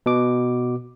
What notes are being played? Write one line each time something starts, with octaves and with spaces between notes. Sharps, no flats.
B2 D6